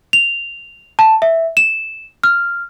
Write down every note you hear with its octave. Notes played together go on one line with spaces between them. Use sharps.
F7
A5
E5
E7
F6